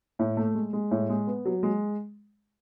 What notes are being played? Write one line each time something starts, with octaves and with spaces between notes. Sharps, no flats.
A2
A3
G#3
G#3
A2
G#3
B3
F#3
G#3